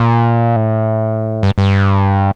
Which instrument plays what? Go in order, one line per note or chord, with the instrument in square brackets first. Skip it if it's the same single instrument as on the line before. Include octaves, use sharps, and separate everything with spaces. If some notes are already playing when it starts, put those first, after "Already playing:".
Already playing: [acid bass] A#2
A2
G2
G2